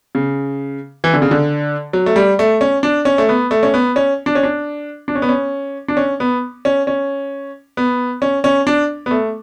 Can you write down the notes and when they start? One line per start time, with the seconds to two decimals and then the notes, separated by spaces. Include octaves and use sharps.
0.15 C#3
1.04 E3
1.14 D3
1.22 C#3
1.31 D3
1.93 F#3
2.06 A3
2.16 G3
2.39 A3
2.61 C#4
2.83 D4
3.05 C#4
3.18 A3
3.29 B3
3.51 A3
3.63 C#4
3.74 B3
3.96 C#4
4.26 D4
4.35 C#4
4.43 D4
5.08 D4
5.15 C#4
5.22 B3
5.29 C#4
5.88 D4
5.97 C#4
6.20 B3
6.65 C#4
6.87 C#4
7.77 B3
8.22 C#4
8.44 C#4
8.67 D4
9.06 B3
9.11 A3